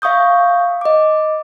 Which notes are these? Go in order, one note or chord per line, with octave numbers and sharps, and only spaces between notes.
E5 F5 C#6 D#6 G6
D#5 D6